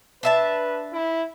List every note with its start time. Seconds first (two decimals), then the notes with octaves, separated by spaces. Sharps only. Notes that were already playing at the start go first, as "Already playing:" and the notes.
0.23 D4 B4 E5 A5
0.93 E4